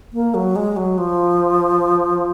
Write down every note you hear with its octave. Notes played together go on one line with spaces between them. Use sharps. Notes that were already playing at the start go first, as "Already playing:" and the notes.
A#3
F#3
G#3
F#3
F3